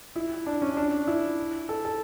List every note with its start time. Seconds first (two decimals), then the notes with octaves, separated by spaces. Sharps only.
0.16 E4
0.46 D4
0.62 C#4
0.77 D4
1.07 E4
1.69 A4
1.85 A4